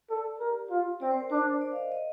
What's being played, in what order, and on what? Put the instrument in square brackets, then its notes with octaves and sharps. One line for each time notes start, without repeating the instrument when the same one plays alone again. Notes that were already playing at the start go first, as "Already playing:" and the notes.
[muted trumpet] A4 [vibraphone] D5
[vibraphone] G4 [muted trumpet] A#4
[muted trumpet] F4
[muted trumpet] C4 [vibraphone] D5
[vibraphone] C5
A#4
[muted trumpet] D4 [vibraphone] C5
[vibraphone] D5
F5
D#5
D#5